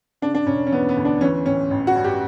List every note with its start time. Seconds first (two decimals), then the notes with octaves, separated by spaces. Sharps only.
0.22 C#3 D4
0.35 D4
0.46 E1 C#4
0.67 C#4
0.72 E3 B3
0.89 B3
0.97 D2
1.05 D4
1.21 E3 C#4
1.46 A1 C#4
1.71 A1
1.87 F#4
1.95 G2
2.04 G4